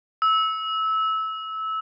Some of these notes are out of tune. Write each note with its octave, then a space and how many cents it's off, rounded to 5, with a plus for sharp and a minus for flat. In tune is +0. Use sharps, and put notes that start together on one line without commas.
E6 -20